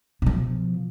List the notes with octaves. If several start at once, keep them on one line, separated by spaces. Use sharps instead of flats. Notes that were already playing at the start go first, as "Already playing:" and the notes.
B2 F3